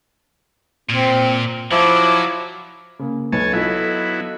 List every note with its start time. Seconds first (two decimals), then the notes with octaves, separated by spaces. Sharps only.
0.90 A#2 C4
1.72 F3 F#3 E4 D6
2.99 C#3 A#3
3.32 B1 B4 C#5 G#5 A5
3.53 F#3 B3 E4 F4 A4 D#5